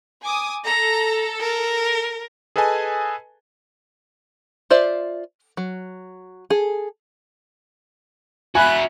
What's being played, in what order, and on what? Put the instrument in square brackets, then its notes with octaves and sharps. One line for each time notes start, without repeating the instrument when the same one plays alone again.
[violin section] G#5 D6 D#6
[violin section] A4 [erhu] A#5
[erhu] A#4
[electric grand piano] G#4 A4 B4 D#5 G#5 A5
[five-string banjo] F4 C5 D5 E5
F#3
G#4 A4
[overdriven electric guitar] F#4 E5 [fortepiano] G#5 [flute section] B5 F#6